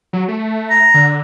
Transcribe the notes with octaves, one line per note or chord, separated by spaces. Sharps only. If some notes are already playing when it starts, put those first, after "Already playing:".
F#3
A3
A#5
D3